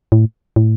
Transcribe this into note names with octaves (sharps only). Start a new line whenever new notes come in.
A2
A2